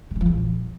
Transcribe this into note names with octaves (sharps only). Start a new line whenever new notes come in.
C3
C#3
F3
E2
A#2